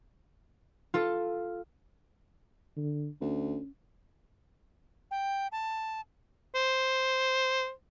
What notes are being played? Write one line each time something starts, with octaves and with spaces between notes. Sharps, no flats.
F4 A4
D3
D2 C#4
G5
A5
C5